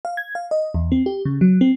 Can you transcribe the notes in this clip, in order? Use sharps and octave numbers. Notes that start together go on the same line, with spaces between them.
F5
G#6
F5
D#5
E2
C4
G4
C#3
F#3
C4